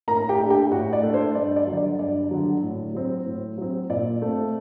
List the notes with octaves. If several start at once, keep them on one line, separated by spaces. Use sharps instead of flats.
A2 A#4 A#5
G4 G5
A3 D4
G4 G5
A2 F#4 F#5
D5
A3 D4
C5
G2 D5
D5
D3 F#3
D5
G2 D5
D3 F#3
A2
F#3 C4
A2
F#3 C4
A#2 D5
A3 C4